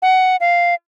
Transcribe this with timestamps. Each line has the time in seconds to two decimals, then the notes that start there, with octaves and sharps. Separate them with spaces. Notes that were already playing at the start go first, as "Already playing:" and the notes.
0.02 F#5
0.40 F5